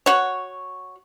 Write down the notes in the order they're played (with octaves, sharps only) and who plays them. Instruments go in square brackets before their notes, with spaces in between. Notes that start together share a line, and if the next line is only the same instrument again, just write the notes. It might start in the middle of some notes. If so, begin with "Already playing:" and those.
[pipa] F#4 C#5